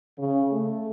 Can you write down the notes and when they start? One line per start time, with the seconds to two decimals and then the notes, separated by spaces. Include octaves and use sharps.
0.18 C#3
0.52 A3